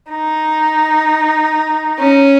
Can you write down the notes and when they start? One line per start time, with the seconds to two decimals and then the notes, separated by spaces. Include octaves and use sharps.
0.10 D#4
2.01 C#4